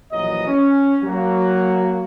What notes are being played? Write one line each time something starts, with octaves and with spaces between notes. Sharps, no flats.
A#1 E3 F#3 D#5
C#4
F#3 A#3 F#4